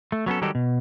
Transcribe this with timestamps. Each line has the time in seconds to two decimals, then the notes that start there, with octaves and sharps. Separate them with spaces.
0.12 A3
0.26 F#3 B3 C#4 A4
0.42 D#3 F#3 G3 D#4 G4 A4
0.55 B2